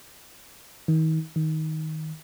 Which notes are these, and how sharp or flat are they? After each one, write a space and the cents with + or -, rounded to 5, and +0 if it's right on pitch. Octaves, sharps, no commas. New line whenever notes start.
D#3 +35
D#3 +15